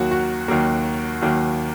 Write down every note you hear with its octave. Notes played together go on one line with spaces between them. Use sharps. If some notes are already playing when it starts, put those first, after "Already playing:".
Already playing: D#2 D#3 F#3 A#3 F#4
F#4
D#2 D#3 F#3 A#3
D#2 D#3 F#3 A#3